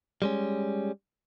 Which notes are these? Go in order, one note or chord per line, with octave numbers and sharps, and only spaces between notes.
G3 G#3 C#4